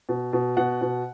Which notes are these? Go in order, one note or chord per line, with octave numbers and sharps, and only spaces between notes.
B2
B2
B2 F#5
B2